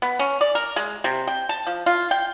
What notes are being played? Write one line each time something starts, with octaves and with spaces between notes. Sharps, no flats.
B3
C#4
D5
A#4
G#3
C3
G5
A5
F3
F4
G5